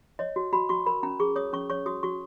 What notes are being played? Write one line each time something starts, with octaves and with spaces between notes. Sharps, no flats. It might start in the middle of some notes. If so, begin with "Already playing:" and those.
C#5 D#5
F#4
F#4 B5
F#4 C#6
A#4 B5
C#4 A#5
G#4 C#6
C#5 D#6
C#4 C#6
C#5 C#6
F#4 D#6
F#4 C#6